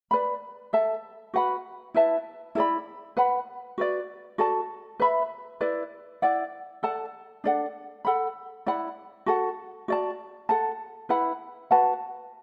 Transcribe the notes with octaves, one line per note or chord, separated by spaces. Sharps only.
B4 D5 B5
A4 E5 A5
F#4 B4 F#5 B5
E4 B4 E5 A5
E4 A4 D5 B5
B4 F#5 B5
F#4 B4 D5
F#4 A4 D5 A5
B4 E5 B5
E4 B4 D5
E4 D5 F#5
A4 D5 F#5 A5
D4 A4 D5 F#5
A4 F#5 B5
E4 D5 F#5 B5
F#4 A4 F#5 A5
F#4 D5 A5
A4 F#5 A5
E4 B4 F#5 B5
F#4 B4 F#5 A5